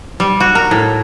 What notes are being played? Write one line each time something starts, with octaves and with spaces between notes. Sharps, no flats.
G3
F#4
A#4
A2